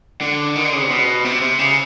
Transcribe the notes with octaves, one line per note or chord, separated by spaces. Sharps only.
D3
D#3
D3
C#3
C3
B2
C3
C3
C#3